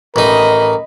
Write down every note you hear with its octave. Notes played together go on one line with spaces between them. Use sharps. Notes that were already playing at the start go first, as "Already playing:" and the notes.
A1 D#4 A#4 D#5 B5